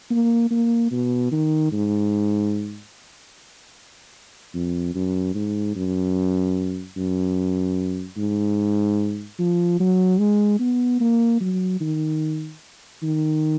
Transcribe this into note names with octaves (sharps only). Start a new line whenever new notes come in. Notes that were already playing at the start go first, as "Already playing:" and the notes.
A#3
A#3
B2
D#3
G#2
F2
F#2
G#2
F#2
F#2
G#2
F3
F#3
G#3
B3
A#3
F#3
D#3
D#3